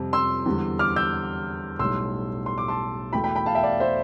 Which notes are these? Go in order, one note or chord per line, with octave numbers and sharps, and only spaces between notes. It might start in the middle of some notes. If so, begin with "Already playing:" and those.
Already playing: F2 C3 G3
C6 E6
E2 D3 G3
D6 F6
E6 G6
B1 A2 G3 C6 E6
C6
D6
A5 C6
E2 B2 A3 G5 B5
G5 B5
G5 B5
F5 A5
E5 G5
D5 F5
C5 E5